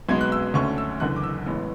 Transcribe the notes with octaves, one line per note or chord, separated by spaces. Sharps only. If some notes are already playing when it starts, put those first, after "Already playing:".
B1 B2 G#3 B3 G#6
F#6
E6
D2 D3 A3 C#4 C#6
E6
F#1 E2 D3 F#6
D6
E6
A1 A2 G#3 B3